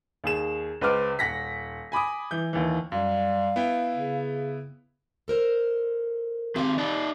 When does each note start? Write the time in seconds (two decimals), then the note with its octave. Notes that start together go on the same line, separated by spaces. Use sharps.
0.24 D#2 G#4 E7
0.81 C#2 B4 C5 D6 F6
1.19 D#1 F#5 A#6 B6
1.92 G#5 B5 D6 D#6
2.31 E3 G6
2.53 D#2 E3
2.92 F#2 G3 F5
3.56 B3 E4 G5
3.92 C#3
5.28 A4 A#4 C5
6.56 D#3 C4 G4 F5
6.78 D#4 D5